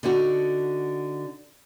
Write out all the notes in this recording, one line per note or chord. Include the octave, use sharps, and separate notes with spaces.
D3 D#4 F#4